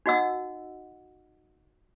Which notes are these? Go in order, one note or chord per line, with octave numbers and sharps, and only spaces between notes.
D#4 F#4 D#5 F#5 E6